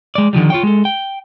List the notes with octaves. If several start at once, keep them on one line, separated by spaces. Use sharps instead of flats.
G#3 D5
D3 D#3 F3 G3
F4 C#5 G5
G#3 A4
G5